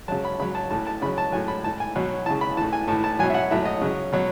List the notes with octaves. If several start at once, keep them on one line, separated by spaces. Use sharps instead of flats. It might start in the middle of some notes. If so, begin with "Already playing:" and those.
C#3 F#3 A5
B5
C#3 F#3 B5
A5
A2 E3 A5
A5
C#3 F#3 B5
A5
A2 F#3 G#5
B5
A2 E3 A5
G#5
B2 F#3
C#3 E3 A5
B5
A2 E3 A5
G#5
A2 E3 A5
A5
B2 F#3 G#5
E5
F#5
A2 F#3 E5
D#5
C#3 F#3
B2 F#3